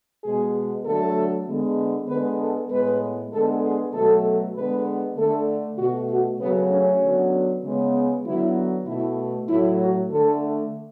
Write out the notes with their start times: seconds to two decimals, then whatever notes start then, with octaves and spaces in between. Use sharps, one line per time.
0.24 B2 G#3 B3 G#4
0.86 D3 F#3 A3 A4
1.47 D3 G#3 B3
2.09 D3 G#3 B3 B4
2.40 A4
2.71 A2 G#3 B3 B4
3.32 D3 G#3 B3 A4
3.63 G#4
3.94 B2 F#3 A3 A4
4.55 D3 G#3 B3 B4
5.17 D3 A3 A4
5.79 B2 A3 F#4
6.09 F#4
6.40 C#3 F#3 A3 B3
6.71 C#4
7.02 D3 F#3 B3
7.63 C#3 G#3 B3
8.25 D3 F#3 B3 E4
8.87 B2 A3 E4
9.48 A2 F#3 A3 E4
9.79 F#4
10.10 D3 A3 A4